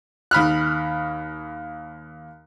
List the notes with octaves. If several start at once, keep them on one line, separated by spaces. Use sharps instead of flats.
D#2 B5 F6 F#6